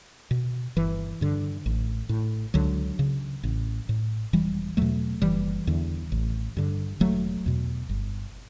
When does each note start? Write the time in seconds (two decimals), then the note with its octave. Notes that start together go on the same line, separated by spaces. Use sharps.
0.31 B2
0.76 G1 E3
1.21 G2 D3
1.66 A1
2.09 A2
2.54 C#2 D3 F#3
2.99 C#3
3.43 A1
3.89 A2
4.33 E1 E3 G3
4.77 E2 B2 F#3 A3
5.22 F#1 E3 G3
5.67 E2 D3
6.12 A1
6.57 G2 D3
7.00 E1 F#3 A3
7.46 E2 B2
7.89 G1